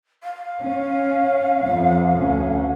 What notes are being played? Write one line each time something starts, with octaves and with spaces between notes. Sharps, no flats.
F5
C#4
F2
D2 C#4